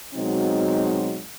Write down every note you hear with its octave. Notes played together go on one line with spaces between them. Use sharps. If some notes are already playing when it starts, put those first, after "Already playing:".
B2 F#3 G#3 C4 D#4 F#4